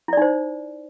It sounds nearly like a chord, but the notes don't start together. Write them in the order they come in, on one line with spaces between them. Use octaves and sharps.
E4 D5 D#4 C5